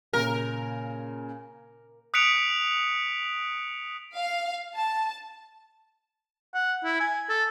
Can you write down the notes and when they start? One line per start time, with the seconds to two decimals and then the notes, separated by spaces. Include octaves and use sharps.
0.13 A#2 C#3 A#4
2.14 D#6 F#6 B6 C#7 D7 F7
4.17 F5
4.75 A5
6.55 F#5
6.85 E4
7.01 G#5
7.29 A4